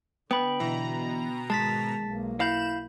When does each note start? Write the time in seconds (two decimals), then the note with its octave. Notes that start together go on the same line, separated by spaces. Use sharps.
0.31 D3 B3 G5 B5
0.60 B2 E3 A#5
1.50 G#2 D#3 G#3 A5 A6 B6
2.04 B1 A#3
2.40 E4 F5 B5 G6 E7